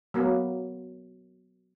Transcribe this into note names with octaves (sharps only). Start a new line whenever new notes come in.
F#3 A#3 B3